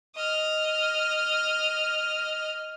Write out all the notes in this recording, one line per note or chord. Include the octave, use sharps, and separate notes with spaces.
D#5 F6